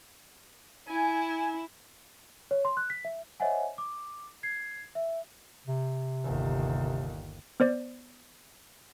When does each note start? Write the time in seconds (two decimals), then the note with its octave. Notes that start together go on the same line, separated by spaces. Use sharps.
0.87 E4 G#5
2.51 C#5
2.65 C6
2.77 F#6
2.90 B6
3.05 E5
3.40 C5 C#5 D#5 E5 F#5 G#5
3.78 D6
4.43 G#6 C7
4.95 E5
5.66 C3
6.24 G1 D#2
7.60 B3 C5 D5